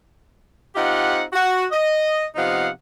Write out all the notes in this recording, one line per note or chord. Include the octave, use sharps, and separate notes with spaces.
C4 D#4 F4 G4 F#5
F#4
D#5
C3 F3 B3 D#4 F5 F#5